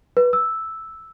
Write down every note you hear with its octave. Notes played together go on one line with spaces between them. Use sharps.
B4
E6